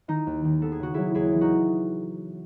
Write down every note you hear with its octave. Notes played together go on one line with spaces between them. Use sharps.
D#3 D#4
D#2
D#3
B3 A4
G#4
C#3 F#4
F#3 E4 G#4
D#2 E4 G#4
E3
D#4 F#4